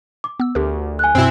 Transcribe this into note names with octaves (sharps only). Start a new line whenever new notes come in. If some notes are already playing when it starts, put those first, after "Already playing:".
D6
B3 E6
D2 G4 A#4
G#5 F#6
F#2 B2 C4 E4